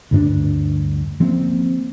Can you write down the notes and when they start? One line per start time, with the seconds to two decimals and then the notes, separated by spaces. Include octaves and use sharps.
0.11 D2 G2 C#4 D4
1.20 F3 A#3 C4 C#4